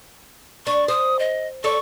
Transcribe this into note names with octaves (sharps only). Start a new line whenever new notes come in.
D4 C#6
C5 D#6
D#5
A4 C#5 D5 C#6